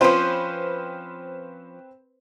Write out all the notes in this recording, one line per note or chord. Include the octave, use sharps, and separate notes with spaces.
F3 C4 C#4 F4 B4 C5